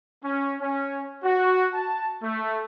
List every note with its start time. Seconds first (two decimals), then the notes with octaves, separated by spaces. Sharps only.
0.24 C#4
0.60 C#4
1.24 F#4
1.74 A5
2.23 A3